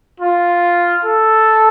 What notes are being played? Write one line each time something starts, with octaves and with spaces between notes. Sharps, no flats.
F4
A4